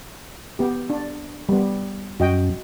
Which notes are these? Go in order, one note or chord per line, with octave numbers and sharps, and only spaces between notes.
B3 G4
D4
G3 B3
F#2 F#4 D#5 G5